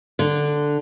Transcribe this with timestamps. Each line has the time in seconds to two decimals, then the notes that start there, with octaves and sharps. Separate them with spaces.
0.19 D3